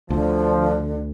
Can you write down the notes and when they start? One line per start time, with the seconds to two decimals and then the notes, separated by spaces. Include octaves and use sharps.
0.10 D2 D3 F3